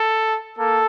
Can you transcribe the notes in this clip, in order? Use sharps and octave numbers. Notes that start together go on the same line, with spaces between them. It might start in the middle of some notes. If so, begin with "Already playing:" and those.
Already playing: A4
A#3 A4